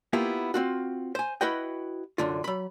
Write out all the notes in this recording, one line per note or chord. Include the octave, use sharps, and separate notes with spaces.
A#3 B3 E4 F4 G4
C4 F4 F#4
C5 G#5
E4 F#4 B4 D#5 G5
C2 F#2 D3 F4
F#3 B5